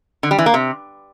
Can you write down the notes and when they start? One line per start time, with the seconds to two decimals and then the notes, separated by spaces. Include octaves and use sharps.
0.23 D3
0.31 G3
0.38 E3
0.46 A#3
0.54 C3